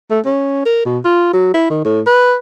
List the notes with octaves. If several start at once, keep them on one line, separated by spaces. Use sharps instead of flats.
A3
C#4
A#4
B2
F4
F#3
E4
D#3
A2
B4